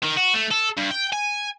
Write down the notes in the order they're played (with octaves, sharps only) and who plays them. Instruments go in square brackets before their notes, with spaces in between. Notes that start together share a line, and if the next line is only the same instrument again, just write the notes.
[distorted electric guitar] D#3
F#4
A3
A4
G2
G5
G#5